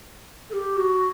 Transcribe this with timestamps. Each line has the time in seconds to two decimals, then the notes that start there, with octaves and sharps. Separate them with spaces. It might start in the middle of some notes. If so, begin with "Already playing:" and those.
0.50 A4
0.53 G4
0.76 F#4